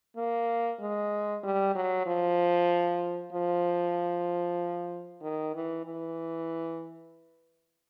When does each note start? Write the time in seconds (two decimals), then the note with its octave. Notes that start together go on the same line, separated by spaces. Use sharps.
0.17 A#3
0.81 G#3
1.44 G3
1.75 F#3
2.06 F3
3.33 F3
5.22 D#3
5.55 E3
5.86 E3